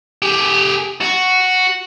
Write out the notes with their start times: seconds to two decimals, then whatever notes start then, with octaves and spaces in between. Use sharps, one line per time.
0.22 G4 G#4
1.01 F#4